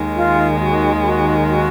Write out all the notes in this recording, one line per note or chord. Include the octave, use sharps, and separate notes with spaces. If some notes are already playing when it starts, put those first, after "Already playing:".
Already playing: D#2 D#3 G#3
F4
F#4
F#4
F#4